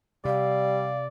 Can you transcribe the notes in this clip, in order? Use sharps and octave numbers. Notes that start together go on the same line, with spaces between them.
C3 G3 D5 F5